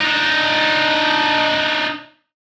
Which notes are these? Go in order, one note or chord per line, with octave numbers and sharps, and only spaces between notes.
D4 D#4